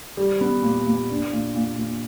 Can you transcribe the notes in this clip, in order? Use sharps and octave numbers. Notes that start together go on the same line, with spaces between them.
G3
B3
A#2
A#2
D4
A#2
A#2
A#2